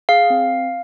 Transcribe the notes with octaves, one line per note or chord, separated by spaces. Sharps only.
G#4 F5
C4